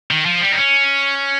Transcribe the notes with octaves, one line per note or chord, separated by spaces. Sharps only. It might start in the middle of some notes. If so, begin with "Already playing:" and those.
D#3
F3
G3
D#4
C#4